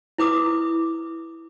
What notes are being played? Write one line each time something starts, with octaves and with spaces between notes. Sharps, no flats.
E4 B4 D6 D#6